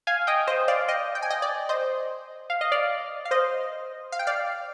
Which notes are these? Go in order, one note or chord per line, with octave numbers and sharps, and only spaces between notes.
F5 G#5
D#5 G5
C5 D#5
D5 F5
D#5 G5
G5
G#5
D#5 G5
D5
C5 D#5
F5
D#5
D5 F5
F5
C5 D#5
F5
G5
D5 F5